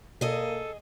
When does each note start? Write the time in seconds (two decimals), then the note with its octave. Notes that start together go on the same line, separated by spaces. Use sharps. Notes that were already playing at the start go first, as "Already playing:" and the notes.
0.21 B2 A#3 G#4 A4 D#5